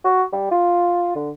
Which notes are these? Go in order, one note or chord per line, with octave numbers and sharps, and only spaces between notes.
F#4
G3
F4
D3